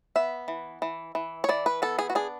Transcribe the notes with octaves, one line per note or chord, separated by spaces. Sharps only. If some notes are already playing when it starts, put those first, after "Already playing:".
B3 E5
E3
E3
E3
C#5
E3 D5
B4
B3 A4
G#4
F#4
D4 G#4